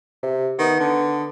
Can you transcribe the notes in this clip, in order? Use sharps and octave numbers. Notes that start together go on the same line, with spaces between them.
C3
D#3 B3
D3